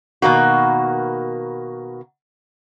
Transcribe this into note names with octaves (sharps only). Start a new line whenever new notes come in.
B2 D#3 A#3 F#4